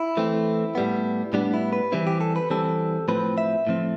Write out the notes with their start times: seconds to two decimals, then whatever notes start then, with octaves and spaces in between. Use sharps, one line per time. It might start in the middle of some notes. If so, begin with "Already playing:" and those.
Already playing: E4
0.17 E3 A3 C4
0.75 A2 G3 B3
1.33 A2 G3 B3 D4
1.54 E4
1.73 B4
1.92 E3 G3 C4 E4
2.07 G4
2.21 A4
2.36 B4
2.50 E3 G3 C4 A4
3.08 A2 F3 C4 B4
3.38 E5
3.67 A2 F3 C4